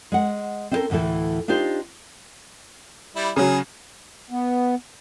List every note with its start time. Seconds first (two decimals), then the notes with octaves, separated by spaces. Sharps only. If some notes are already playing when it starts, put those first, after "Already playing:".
0.12 G#3 F#5
0.71 C4 C#4 E4 F4 A4 A#4
0.90 D2 A2 E3 E4 A4
1.48 D4 D#4 F4 G4 C5
3.16 G3 E4
3.36 C#3 F#3 G#4
4.30 B3